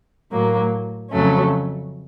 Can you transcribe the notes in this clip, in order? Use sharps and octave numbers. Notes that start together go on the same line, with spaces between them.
A2 F#3 A#3
F2 C#3 F#3 A3 C#4